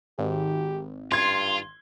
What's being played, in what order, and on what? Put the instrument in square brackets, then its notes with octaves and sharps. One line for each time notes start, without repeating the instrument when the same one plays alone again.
[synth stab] G#1 [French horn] G4
[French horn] G2 [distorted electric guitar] F4 [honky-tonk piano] C6 G#6